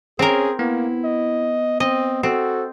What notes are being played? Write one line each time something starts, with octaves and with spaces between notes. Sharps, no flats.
C4 C#4 G#4 A#4
A#3 B3 E4
D#5
C4 D#5
C4 F#4 A4